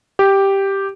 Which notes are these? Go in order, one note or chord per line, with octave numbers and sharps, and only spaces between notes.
G4